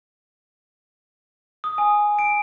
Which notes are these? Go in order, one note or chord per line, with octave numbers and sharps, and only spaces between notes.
D#6
G#5
D7